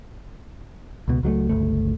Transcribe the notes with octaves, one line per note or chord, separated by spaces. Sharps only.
C#2 B2
C#2 F#3 G#3 A3
G1 C#2 A3